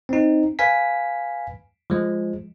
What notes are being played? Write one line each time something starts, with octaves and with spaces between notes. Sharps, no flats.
C4 D#4
B4 F5 G#5 B6
F3 G#3